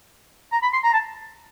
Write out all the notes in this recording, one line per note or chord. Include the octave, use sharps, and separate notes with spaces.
A#5
B5
C6
A#5
A5